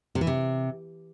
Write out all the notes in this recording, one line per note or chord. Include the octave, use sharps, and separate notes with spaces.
C3
E3
C3